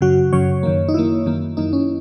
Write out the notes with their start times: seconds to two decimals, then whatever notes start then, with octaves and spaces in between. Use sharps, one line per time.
0.01 F#2 C#3 F#3 F#4
0.33 F#2 C#3 F#3 C#5
0.63 F#2 D#3 A#3
0.88 D#4
0.94 F#2 D#3 A#3 E4
1.26 F#2 D#3 A#3
1.57 F#2 D#3 A#3 D#4
1.73 C#4